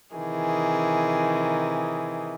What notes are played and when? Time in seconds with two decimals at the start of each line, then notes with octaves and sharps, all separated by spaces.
0.16 C3 D#3 E3 G#4